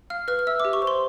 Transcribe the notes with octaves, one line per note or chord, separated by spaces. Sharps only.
F5 F6
B4 F6
F6
E5 E6
D6
G4
C#6
C5
C6